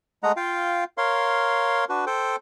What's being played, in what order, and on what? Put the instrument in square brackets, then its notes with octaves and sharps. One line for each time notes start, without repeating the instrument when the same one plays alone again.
[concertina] G#3 A3 D#5 F#5 A#5
F4 F5 G5
A#4 C#5 F5 C6
D4 F#4 B4
A4 C5 G5